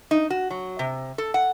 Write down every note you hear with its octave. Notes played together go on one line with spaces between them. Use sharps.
D#4
F#4
F#3
C3
A4
F#5